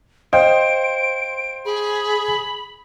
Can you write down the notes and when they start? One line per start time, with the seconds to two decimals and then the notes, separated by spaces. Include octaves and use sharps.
0.33 C5 D#5 F5 G5 D7
1.65 G#4 B5